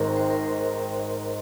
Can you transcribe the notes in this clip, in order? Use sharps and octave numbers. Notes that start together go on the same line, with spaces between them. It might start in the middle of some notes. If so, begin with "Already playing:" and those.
Already playing: G#1 G#2 D#3 A#4
C5
A#4
C5